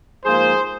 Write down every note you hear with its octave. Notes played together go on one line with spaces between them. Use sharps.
G#2 F3 A#3 G#4 C5